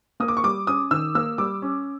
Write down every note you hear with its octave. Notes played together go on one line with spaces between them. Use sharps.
A#3 D#6
D6
C#6
G3 D6
C#4 D#6
D#3 E6
A#3 E6
G3 D6
C#4